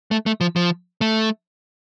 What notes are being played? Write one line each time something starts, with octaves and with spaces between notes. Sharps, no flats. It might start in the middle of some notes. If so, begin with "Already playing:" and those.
A3
A3
F3
F3
A3